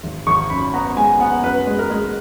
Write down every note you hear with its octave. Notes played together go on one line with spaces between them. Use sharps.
G#1
G#1 C#6
F#2 B5
B3 A#5
G#3 G#5
B3 F#5
F#2 B4
G#3
A#4
G#3